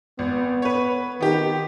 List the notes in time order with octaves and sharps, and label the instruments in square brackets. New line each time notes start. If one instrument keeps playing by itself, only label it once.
[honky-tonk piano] G#1 [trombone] B3
[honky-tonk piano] B4 C#5
[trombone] D#3 [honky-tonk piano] B3 G4